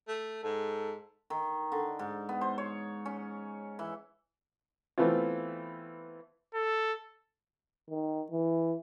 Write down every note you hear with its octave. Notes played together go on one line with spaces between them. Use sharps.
A3
G#2 A4
D#3
D3
G#2
B3
C5
C#5
C#4
E3
E3 A3 B3 C4 F4
A4
D#3
E3